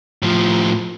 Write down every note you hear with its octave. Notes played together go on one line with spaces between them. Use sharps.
A2 F3